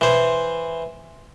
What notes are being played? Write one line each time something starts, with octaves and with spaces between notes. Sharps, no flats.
E3 C5